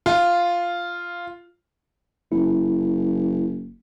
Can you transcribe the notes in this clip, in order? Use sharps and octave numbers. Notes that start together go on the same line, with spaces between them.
F4
F#1 E4